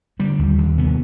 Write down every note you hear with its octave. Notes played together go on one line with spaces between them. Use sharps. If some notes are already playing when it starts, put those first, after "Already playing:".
D3 G3
D#2
D#2
C3 B3